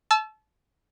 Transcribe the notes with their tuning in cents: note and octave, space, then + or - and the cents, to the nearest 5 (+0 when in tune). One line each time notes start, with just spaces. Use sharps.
A5 -30 E6 +20